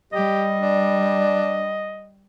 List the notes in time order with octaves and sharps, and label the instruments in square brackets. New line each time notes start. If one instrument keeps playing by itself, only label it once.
[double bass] G3 [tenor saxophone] G4 [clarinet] D#5
[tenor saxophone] D4